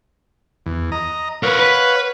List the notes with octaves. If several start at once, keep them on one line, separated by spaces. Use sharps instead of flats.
E2
D#5 A#5
A#4 B4 C#5 F5 F#5
B4